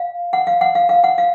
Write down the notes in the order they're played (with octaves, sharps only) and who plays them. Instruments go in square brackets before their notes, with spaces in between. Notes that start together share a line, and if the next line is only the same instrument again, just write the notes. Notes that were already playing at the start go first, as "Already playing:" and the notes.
Already playing: [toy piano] F5
F#5
F5
F#5
F5
F5
F#5
F5